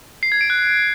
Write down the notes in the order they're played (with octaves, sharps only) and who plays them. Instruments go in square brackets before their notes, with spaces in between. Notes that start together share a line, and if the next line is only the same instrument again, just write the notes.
[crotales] C7
G#6
D7
F#6